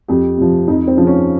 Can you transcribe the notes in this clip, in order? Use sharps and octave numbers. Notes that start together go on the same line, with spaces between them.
F2 G4
C3 F3
F2 D#4
C4
C#3 F3
C#4